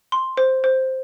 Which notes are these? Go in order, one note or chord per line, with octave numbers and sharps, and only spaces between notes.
C6
C5
C5